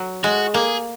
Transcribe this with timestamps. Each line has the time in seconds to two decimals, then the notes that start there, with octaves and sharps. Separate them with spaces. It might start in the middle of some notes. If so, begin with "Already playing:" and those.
Already playing: F#3
0.24 G#3 F#4
0.54 A#3 G#4